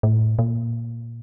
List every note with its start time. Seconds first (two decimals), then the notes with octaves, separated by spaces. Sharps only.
0.03 A2
0.39 A#2